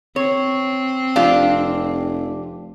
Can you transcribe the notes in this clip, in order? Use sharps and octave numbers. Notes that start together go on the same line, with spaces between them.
C4 C#5
F1 D4 F4 G4